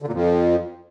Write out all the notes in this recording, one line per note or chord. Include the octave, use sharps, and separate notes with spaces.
D3
A#2
F2